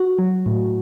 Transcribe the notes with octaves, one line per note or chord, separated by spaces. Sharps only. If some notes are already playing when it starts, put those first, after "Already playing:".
Already playing: F#4
F#3
A2